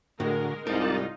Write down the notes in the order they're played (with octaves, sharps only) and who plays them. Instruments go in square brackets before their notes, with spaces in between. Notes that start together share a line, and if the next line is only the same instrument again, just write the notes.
[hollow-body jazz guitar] A2 [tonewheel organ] D3 F#4 [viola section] G#3 A#4
[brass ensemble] C2 G#2 [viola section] D#4 F4 [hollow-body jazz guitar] A#4 [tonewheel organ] D5 A5